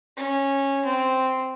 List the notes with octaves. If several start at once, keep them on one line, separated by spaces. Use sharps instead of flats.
C#4
C4